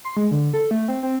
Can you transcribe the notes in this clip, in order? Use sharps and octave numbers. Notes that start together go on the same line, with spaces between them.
C6
G#3
D3
A4
A3
C4
C4